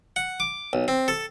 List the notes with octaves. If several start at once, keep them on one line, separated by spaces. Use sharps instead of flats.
F#5
D6
B1
C4
A4